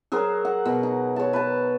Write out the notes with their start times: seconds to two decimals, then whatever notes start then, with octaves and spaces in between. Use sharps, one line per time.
0.12 F#3 G#4 A#4 C5
0.45 F#5
0.65 B2
0.83 D#4
1.16 C#5 A5
1.33 B4 A5